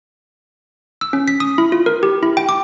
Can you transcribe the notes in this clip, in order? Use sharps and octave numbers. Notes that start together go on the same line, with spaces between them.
E6
C#4
B6
D#6
E4
F4
A#4
G4
E4
G5
D6